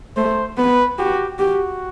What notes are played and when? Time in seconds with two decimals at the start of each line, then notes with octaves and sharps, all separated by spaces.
0.16 A3 C5
0.57 B3 B4
0.98 F#4 G4
1.39 F#4 G4